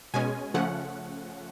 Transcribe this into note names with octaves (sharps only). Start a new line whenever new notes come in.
B2 G#3 C#4 G#5
C#3 F3 A3 C#4 F#5